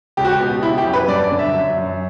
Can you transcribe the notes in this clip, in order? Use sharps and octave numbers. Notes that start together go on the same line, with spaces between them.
C#2 G4
F#4
G4
B2
C#3 E4
G4
F#2
B4
G2 D5
D5
D3
E5
F#2
F#2